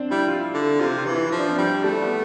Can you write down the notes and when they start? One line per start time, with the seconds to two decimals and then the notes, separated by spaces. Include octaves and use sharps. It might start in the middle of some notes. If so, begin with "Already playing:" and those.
Already playing: C4 D4
0.11 G3 E4
0.28 F4
0.54 D3
0.80 C3 F4
0.98 F4
1.06 E3
1.14 E4
1.32 F3
1.39 D4
1.49 C4
1.58 G3
1.84 G3 A3
2.02 B3